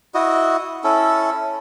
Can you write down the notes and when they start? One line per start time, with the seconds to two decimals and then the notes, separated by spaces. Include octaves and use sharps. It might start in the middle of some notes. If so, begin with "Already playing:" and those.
0.14 E4 F#4 D#5
0.84 C#4 E4 A4